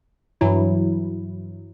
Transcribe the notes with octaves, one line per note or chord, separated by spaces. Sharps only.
G2 E3 F#3 E4